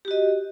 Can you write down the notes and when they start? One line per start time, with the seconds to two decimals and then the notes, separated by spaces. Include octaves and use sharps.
0.05 G4
0.08 F#4
0.11 D#5